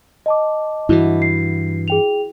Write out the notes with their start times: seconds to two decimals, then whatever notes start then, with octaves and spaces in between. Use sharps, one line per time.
0.26 D#5 A5 D6
0.89 G2 E3 E4 F#4
1.22 C7
1.88 G#4 G5 F7